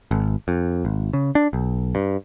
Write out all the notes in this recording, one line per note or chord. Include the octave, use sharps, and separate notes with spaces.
G#1
F2
G#1
C#3
D4
B1
G2